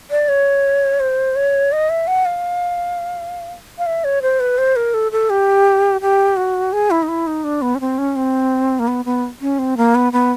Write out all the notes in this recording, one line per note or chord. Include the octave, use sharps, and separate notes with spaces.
D5
C#5
C5
C#5
D#5
E5
F#5
F5
F5
E5
C#5
C5
B4
C5
A#4
A4
A4
G4
G4
F#4
G#4
E4
D#4
E4
D#4
D4
B3
C#4
C4
C#4
C4
A#3
B3
B3
C#4
C4
A#3
B3
B3